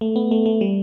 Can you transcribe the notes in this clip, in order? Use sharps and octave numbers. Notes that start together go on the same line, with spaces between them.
A3
B3
A3
A3
G3